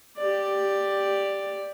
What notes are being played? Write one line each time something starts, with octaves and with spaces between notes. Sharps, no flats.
G4 D5